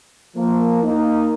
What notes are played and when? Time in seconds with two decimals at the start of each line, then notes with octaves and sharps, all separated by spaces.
0.36 F3 A#3
0.83 A#3 D#4